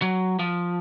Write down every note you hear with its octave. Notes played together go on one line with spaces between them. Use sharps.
F#3
F3